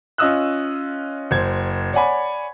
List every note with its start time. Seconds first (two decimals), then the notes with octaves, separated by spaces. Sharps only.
0.18 C#4 F4 D#5 D#6 E6 F#6
1.31 F#1 C5 G#6
1.93 C#5 D5 F#5 G#5 B5